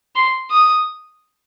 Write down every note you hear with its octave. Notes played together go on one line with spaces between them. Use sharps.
C6
D#6